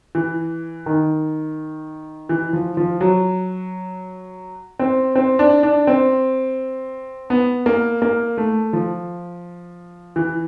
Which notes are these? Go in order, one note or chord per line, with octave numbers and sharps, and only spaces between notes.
E3
D#3
E3
F3
F3
F#3
C4
C4
D4
D4
C4
B3
A#3
A#3
A3
F3
E3